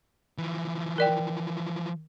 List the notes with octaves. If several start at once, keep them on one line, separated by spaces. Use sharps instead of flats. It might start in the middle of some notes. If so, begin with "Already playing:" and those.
E3 F3
A#4 D5 G5